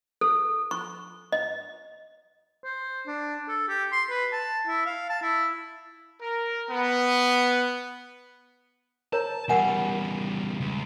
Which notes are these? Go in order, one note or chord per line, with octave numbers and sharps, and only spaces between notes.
A4
C#6
D#5
C5
D4
A4
G4
C6
B4
A5
E4
F5
A5
E4
A#4
B3
A#4 C#5 A5 A#5
E2 G3 A#4 F#5 G#5
C#2